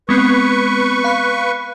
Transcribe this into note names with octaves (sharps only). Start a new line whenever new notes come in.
G#3 B3 C4 B4 C#6
F5 B5 F#6